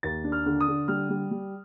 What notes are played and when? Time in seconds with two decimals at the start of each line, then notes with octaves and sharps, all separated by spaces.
0.03 D#2 A6
0.24 D4
0.32 F6
0.46 D3
0.60 D#6
0.68 D3
0.88 G3 F6
1.10 G3
1.31 G3